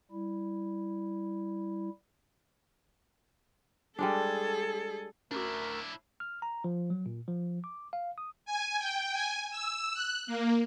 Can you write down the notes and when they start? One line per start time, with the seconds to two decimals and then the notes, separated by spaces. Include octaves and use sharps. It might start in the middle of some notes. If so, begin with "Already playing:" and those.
0.11 G3 E4
3.99 G3 G#3 D4 G#4 A4
5.31 D2 A3 C#4 D4 E4 F#4 A#4
6.20 F6
6.42 A#5
6.64 F3
6.90 F#3
7.06 A#2
7.28 F3
7.64 D6
7.93 F5
8.18 D#6
8.45 G#5
8.79 G5
9.13 G#5
9.51 E6
9.94 F#6
10.27 A#3